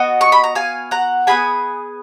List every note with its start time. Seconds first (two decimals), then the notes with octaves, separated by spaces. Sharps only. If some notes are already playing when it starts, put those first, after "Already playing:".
Already playing: B3 F#4 D#5
0.21 C#6
0.32 B5
0.44 A#5
0.55 F5 G#5
0.91 F#5 A#5
1.27 B3 F4 G#4 G#5 B5